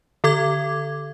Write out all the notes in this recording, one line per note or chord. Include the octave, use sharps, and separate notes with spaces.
D3 A4 D6 G#6